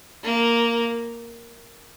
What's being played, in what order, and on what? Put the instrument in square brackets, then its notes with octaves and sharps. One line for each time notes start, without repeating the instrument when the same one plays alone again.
[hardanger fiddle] A#3